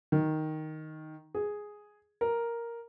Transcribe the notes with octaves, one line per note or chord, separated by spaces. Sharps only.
D#3
G#4
A#4